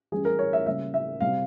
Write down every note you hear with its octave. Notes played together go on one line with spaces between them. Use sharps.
E3 G3 C#4 G#4
A#4
C#5
E5
C#3 G3 A#3 E5
E5
C3 G3 C4 F5